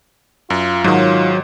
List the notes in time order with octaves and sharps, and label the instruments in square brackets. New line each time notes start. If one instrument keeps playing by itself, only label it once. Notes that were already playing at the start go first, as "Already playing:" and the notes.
[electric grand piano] F#2 [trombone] F4
[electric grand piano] G#2 D#3 [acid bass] F#3